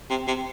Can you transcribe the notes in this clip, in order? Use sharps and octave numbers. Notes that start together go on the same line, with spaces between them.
C3
C3